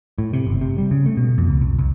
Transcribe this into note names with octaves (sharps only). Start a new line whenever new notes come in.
A2
C3
G1
C3
G3
C#3
A3
B2
F2
C#2
C2
C2